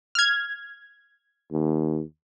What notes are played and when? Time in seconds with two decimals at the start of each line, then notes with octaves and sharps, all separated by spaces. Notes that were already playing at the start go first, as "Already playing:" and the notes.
0.15 F6 G#6
1.52 D#2